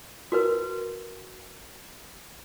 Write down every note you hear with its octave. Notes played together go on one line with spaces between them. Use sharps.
F#4 A#4 B4